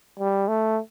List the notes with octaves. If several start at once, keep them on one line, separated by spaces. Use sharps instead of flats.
G3
A3